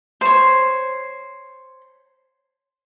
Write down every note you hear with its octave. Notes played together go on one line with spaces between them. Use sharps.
C5 C#5